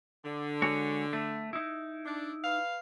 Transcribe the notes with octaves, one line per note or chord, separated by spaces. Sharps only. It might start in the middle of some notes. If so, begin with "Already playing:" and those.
D3
G#3 F#4 C#5
A3
D#4 E4
D4
B4 F5